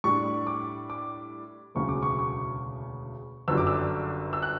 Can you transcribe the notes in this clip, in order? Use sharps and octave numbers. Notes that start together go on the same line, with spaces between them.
A2 G3 D4 C#6
D6
D6
E1 D2 C#3 F#3 C#4 C#6
D6
C#6
C#6
G1 F#2 D3 G3 E6
D6
E6
E6
F#6